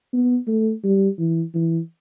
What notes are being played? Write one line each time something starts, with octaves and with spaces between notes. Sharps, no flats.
B3
A3
G3
E3
E3